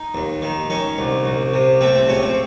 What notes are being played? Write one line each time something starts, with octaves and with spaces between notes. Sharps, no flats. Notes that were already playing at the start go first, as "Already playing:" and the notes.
Already playing: D#4
D#2
D#3
D#3 C#4
C2
C2
C3
A3 C4
C4
C#2 C#4
C4